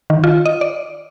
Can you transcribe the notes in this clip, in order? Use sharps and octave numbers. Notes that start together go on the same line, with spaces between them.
D#3
F4
D#5
D5